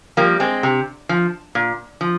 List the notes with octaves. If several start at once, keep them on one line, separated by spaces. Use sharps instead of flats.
F3 G3 A#3
G#3 C4
C3
F3
A#2
F3